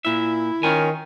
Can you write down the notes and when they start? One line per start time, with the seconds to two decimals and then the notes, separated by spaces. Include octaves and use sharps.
0.05 A#2 E4 E5
0.63 D#3 C#4 F4 G#5